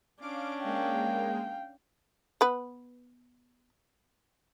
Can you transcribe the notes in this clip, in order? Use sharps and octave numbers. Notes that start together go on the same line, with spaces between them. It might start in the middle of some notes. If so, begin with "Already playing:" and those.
C#4 D4 F5 D6 D7
G#3 A#3 F5 G5
B3 B4